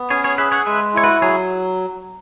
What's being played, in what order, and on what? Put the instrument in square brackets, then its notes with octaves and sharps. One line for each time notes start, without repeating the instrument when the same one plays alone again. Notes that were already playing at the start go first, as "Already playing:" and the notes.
Already playing: [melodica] B3
[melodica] C#4 [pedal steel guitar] G#4 C#5
[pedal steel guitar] G#4 C#5
[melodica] G#4 [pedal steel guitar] B4 E5
[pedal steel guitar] C#5 F#5
[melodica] G#3 [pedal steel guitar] B4 E5
[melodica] E4 [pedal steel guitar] C#5
[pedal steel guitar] F#4 B4
[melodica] F#3 [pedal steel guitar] G#4 C#5